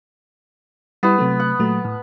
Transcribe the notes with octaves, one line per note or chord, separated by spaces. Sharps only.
G3 B3 E4
C3 F#3 A3
F#5
A#2 F#3 A3
A2